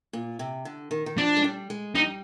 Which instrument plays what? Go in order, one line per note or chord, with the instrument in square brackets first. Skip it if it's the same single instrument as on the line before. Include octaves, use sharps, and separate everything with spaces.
[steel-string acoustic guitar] A#2
C3
D3
D#3
D#3
[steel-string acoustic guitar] F3 [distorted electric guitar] D4
[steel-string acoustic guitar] G#3
G3
G#3
[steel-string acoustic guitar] G3 [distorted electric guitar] D#4